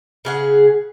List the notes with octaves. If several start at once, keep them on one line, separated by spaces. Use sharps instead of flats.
C#3 G#4 F#5